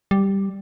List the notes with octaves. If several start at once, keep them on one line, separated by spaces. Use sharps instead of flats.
G3